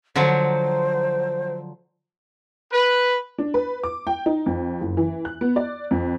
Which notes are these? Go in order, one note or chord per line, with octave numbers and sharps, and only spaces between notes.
D3 F3 F#3 C5
B4
D4
B4
D6
G5
D#4
F2
F#1
E3
F#6
B3
D5
F2